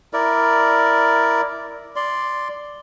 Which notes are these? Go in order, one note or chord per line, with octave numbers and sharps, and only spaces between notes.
E4 A#4 D5
D5 C6